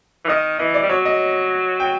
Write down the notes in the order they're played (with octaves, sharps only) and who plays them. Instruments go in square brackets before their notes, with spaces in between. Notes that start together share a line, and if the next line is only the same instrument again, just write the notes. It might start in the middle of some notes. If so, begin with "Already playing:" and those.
[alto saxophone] E3
[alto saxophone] D#3 [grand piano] D#5
[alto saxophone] E3 [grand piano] D#5
[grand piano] D5
[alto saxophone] G3
[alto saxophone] F#3 [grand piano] C#5
[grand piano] D#5
G5